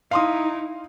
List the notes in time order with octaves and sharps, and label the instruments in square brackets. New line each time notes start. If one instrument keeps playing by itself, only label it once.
[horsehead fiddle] D#4 E4 [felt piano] F5 C6 D#6